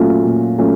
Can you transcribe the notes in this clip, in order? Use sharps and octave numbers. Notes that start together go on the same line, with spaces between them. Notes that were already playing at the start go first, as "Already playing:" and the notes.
Already playing: A#2 F#3 A3 C#4 F4
A#2
F#3 A3 C#4 F4